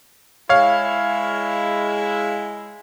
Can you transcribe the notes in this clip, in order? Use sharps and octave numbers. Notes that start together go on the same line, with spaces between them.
G#3 E4 C#5 F5